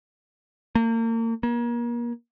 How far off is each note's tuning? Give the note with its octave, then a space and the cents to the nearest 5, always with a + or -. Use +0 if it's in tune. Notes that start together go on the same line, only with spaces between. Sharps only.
A#3 -35
A#3 +35